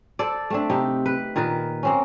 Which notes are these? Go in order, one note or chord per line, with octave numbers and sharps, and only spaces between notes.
A4 C5 D5
A3 C4 D4
C3 D#4 G4
B4
A#2 D#3 A#4 B4
A#3 C4 C#4